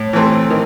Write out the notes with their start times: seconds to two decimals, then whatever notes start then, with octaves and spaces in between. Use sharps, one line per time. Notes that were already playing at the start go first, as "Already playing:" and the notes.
Already playing: A2
0.13 E3 A3 C4
0.50 D#3